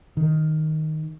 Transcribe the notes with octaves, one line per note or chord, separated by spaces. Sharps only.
D#3